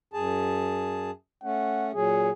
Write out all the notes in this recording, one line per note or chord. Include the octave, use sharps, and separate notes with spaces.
F#2 G#4 A5
A3 C#4 F#5
A#2 F#3 G#4